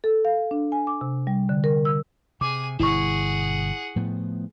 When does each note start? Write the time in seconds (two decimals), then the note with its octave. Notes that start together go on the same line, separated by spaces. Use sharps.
0.04 A4
0.25 F5
0.51 D4
0.72 G#5
0.87 D6
1.01 C3
1.27 G3
1.49 D3
1.64 A#4
1.85 E6
2.41 C3 G#4 G#5 D6
2.80 G1 B2 E4 G#4 F#5 C#6
3.96 A2 F3 B3